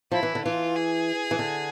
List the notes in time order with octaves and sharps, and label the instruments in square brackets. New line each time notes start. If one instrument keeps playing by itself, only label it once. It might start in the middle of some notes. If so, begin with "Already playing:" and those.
[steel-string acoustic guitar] F3 [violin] E4
[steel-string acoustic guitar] E3
D3
[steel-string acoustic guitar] E3 [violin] F4
[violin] G#4
[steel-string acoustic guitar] E3
D3